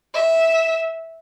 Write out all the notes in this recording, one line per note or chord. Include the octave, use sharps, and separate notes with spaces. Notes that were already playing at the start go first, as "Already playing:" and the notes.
E5